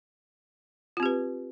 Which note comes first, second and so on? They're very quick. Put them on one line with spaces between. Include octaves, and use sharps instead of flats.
F4 C4 G4 B4